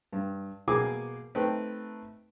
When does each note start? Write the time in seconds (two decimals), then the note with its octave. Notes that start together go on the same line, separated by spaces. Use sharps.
0.13 G2
0.68 B2 A#3 G#4 G#5 D6
1.35 A3 C4 D#4 B4 G5